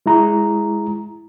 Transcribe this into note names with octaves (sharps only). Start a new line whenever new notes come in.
G#3 E4 A#5